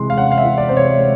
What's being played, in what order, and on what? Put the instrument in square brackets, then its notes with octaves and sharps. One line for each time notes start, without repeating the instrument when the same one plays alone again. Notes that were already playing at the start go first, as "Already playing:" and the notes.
Already playing: [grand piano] C3 E3 G#3 C6
F5
C#4 F#5
F5
E5
E3
D5
C3 C5
C#5
G#3